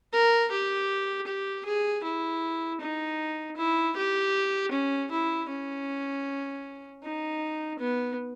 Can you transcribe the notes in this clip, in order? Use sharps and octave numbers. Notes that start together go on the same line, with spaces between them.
A#4
G4
G4
G#4
E4
D#4
E4
G4
C#4
E4
C#4
D#4
B3